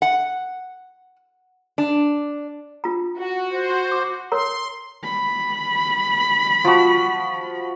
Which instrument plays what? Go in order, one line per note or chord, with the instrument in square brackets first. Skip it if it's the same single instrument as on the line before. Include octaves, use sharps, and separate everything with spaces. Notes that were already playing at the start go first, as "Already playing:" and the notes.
[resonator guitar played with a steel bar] F#5
D4
[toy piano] D4 F4 A#5
[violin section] F#4
[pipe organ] C5
[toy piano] D6
[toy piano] A#4 C#5 A#5 [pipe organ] C6
[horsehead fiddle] B5
[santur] F3 F#4